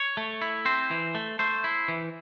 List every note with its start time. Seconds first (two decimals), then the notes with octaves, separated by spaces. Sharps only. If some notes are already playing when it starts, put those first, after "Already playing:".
Already playing: C#5
0.17 A3
0.42 E4
0.65 C4 C5
0.91 E3
1.15 A3
1.39 A3 C5
1.64 E4
1.88 E3